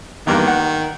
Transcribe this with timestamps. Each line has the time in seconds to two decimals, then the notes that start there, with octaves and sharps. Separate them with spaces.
0.27 E2 G2 D#3 A#3
0.47 F#5